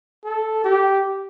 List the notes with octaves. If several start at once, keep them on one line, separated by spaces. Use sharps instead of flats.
A4
G4